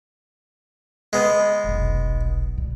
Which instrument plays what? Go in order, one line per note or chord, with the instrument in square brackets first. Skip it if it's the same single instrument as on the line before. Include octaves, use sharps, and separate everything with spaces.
[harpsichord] G#3 B3
[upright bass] F1 B1
B2 G3